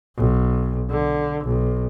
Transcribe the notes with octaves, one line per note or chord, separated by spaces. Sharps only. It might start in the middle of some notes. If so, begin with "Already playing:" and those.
B1
D3
B1